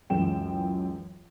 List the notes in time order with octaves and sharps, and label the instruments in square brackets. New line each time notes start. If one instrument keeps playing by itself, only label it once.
[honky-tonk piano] C#2 F#2 E3 G5 E7